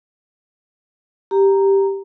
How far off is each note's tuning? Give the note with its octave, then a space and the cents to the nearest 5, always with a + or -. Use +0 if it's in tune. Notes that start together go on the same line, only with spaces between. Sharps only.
G4 +0 A#5 +0